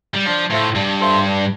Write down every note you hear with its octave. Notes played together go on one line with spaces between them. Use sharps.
G3
F3 D4
A2 F4 A4 C5 E5
G2 D4
F4 A4 C5 E5
D4